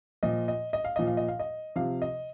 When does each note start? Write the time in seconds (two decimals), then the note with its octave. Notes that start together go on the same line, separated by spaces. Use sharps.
0.23 A#2 F3 D#5
0.48 D#5
0.73 D#5
0.84 F5
0.96 A#2 F3 D#5
1.07 F5
1.17 D#5
1.28 F5
1.40 D#5
1.76 C3 F3 F5
2.02 D#5